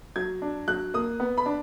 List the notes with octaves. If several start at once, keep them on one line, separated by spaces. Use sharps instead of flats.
F#3 G#6
D4
F#3 F#6
A#3 D#6
B3
B5
D4